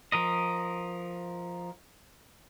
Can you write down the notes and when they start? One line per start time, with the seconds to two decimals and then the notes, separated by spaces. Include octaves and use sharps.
0.12 F3 A#4 D#5